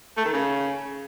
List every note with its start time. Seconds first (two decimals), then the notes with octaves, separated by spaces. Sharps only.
0.17 A3
0.25 D#3
0.33 C#3